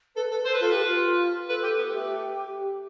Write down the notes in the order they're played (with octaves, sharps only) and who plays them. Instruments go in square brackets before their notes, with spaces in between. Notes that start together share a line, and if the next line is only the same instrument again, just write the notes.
[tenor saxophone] A4 [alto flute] B4
[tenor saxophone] A4 [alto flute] B4
[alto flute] A4 [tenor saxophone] C5
[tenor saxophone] B4
[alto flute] F4 [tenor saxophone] A4
[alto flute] G4 [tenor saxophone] B4
[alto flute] F4
[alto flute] A4 [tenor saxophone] B4
[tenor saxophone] G4
B3
[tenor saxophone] A3 [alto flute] G4